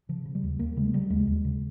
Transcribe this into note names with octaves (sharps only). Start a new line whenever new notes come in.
C#3 F3
C#3
G3
D#2
D#2 A#3
C#3 G#3
C#3 G3
D#2 G#3
D#2
C#3